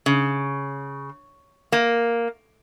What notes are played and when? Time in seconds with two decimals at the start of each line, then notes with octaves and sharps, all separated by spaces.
0.06 C#3
1.72 A#3